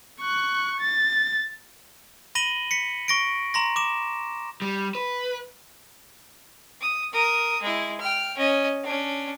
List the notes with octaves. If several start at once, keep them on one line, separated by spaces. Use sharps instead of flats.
C#6 F#6
A6
B5 A#6 D#7 F#7 G7
B6 C#7
C#6 A#6 D7
A#5 C6 A#6
D6 E7
G3
B4
D#6
A#4 D#6
G#3 E4
G5 F6
C#4 D#5
C#4 D4